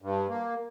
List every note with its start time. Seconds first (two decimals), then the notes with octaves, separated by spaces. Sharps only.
0.02 G2
0.29 A#3